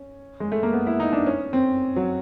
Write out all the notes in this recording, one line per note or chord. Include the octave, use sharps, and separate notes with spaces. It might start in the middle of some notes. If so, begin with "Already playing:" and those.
Already playing: C#4
G#3
A3
A#3
B3
E4
D#4
D4
C#4
C4
F#3